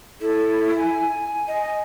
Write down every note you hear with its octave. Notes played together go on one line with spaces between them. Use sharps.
E4 A4
G#5
D#5